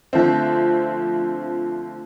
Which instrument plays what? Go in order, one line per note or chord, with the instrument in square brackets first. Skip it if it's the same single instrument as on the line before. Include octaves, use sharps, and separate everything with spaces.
[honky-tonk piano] D3 F3 A3 C4